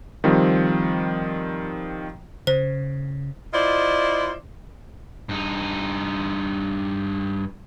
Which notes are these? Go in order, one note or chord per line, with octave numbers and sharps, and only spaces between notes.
D#3 F3 G3 C4
C#3 C5
E4 F4 C5 D5 D#5
G2 D#4